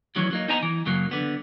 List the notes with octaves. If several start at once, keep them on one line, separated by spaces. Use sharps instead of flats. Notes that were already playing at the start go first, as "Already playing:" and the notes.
D2 D#3 E3 F#3 C#4
F#3 A#3 D#4
B3 D#4 C5 D#5 G#5 A#5
E3
F#2 C#3 F#3 A#3
D3 B3